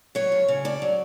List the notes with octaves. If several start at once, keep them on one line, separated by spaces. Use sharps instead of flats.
F#3 C#5
D2
C#3
D2 D5
F#3